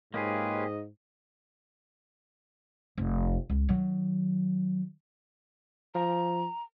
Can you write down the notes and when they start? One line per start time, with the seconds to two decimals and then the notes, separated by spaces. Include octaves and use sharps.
0.14 G#2 A#3 F4 G4 G#4 B4 C#5 D#5
2.98 F1
3.50 C#2
3.69 D#3 F#3
5.95 F3 A#5